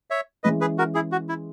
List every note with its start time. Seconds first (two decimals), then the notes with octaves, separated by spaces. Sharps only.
0.10 C#5 E5
0.44 E3 G#3 C#4 B4 D#5
0.61 G#4 B4
0.78 F#4 A#4
0.95 E4 G#4
1.12 F#4
1.29 E4